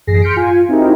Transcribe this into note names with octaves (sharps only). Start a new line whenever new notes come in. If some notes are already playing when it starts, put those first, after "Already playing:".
A1 F#2 G#4 A#6 C7
C6 F6 G6 B6 C#7 D7
F4 G#5
C4 D#4 E4 F#4 G4 A#4